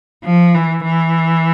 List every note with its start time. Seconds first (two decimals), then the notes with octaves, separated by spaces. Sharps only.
0.24 F3
0.54 E3
0.84 E3